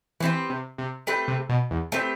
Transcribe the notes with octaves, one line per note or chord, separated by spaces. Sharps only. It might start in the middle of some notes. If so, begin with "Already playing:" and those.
E3 A3 C4 G4 B4
C3
C3
A3 C4 G4 B4
C3
B2
E2
A3 C4 G4 B4